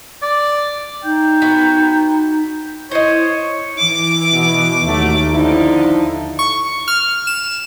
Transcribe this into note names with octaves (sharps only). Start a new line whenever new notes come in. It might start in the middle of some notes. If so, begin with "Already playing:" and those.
D5
D#4 G5
B3 F#4
E4 C5 C#5 D#5
E3 D6
B2
D#2 F#3 A3
D3 F3 D#4 E4
C#6
F6
E7